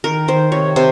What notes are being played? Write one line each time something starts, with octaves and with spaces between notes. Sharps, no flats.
D#3 A#4
D#3 C5
C3 C#5
C3 C5